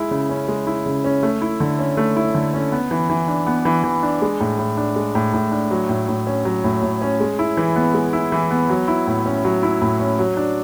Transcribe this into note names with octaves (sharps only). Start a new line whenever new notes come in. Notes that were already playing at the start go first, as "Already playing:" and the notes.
Already playing: G#3 E4
C#3
C#4
G#3
E4
C#3
C#4
A3
E4
D3
C#4
A3
E4
D3
C#4
B3
E3
E3
D4
B3
E3
E3
D4
G#3
A2
A2
D4
G#3
A2
A2
D4
F#3
A2
A2
C#4
F#3
A2
A2
C#4
G#3
E4
E3
B3
G#3
E4
E3
B3
F#3
E4
A2
C#4
F#3
E4
A2
C#4
F#3
D4